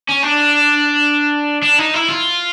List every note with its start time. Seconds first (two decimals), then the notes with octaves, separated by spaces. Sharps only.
0.09 C#4
0.23 D4
1.62 D4
1.78 D#4
1.94 E4
2.09 F4